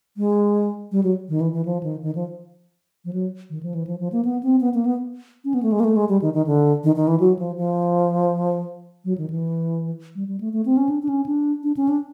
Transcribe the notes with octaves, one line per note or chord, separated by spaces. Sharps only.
G#3
G3
F#3
D#3
E3
E3
F3
D#3
D#3
F3
F3
F#3
D#3
F3
E3
F3
F3
A#3
B3
C4
B3
A#3
B3
C#4
B3
A3
G#3
A#3
A3
G#3
G3
D#3
D#3
D3
D#3
D#3
E3
F#3
F3
F3
F#3
D#3
E3
G3
G3
A3
A3
C4
C#4
D4
D4
C#4
D4
D4
C#4
D4